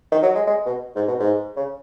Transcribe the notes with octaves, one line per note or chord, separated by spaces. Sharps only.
D#3
F#3
G#3
G#3
B2
G#2
B2
G#2
C#3